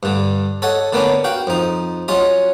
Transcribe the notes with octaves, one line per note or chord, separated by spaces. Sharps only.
G2 D3
A4 C#5 D#5 F#5
D3 A#3 B3 C#4 D4
F#4 F5 G5
F2 D#4
F#3 C#4 F4 D#5